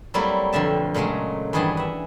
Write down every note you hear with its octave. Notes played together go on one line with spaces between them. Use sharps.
F#3 G3 A3 A#3 C4 E4
F2 B2 D3 E5 A5
A#2 C#3 F#3 G#3 A3
G2 D#3 E3 G#4 F#5 A5
E5 F#5